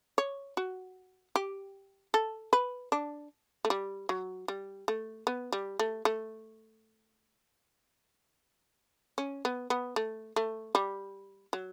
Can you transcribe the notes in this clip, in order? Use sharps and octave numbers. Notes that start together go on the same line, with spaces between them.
C#5
F#4
G4
A4
B4
D4
A3
G3
F#3
G3
A3
B3
G3
A3
A3
C#4
B3
B3
A3
A3
G3
F#3